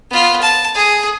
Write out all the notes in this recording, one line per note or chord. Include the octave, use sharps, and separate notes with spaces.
B3 F4
A5
G#4